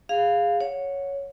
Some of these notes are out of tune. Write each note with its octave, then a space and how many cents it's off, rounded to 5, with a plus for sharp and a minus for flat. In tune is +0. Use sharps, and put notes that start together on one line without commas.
G#4 -15 F5 +0
C#5 +0 F#5 -25